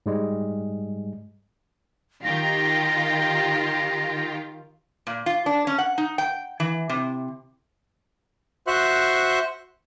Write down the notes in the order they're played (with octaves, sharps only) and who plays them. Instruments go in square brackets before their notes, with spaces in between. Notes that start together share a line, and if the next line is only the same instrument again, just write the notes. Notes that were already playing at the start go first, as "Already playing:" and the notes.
[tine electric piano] G#2 G3 G#3
[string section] D#3 F4 G4 [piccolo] A#6
[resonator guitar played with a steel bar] A#2
F4
D4
C#4
F#5
D#4
G5
E3
C3
[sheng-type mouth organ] F#4 C5 E5 C6 C#6 F#6